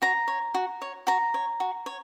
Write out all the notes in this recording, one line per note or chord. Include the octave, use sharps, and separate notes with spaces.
F#4 A#5
C#5
F#4
C#5
F#4 A#5
C#5
F#4
C#5